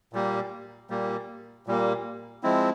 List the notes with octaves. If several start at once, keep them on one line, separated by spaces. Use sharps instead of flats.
A#2 G3 A#3
A#2 G3 A#3
A#2 G3 A#3
F3 G#3 C4 E4